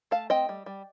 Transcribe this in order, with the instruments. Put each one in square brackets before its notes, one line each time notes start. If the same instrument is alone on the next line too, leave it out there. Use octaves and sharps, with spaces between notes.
[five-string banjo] A3 F5 A5
C4 D#5 G5
G3
G3